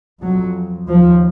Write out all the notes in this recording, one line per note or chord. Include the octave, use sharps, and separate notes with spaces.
F2 F#3
D#2 F3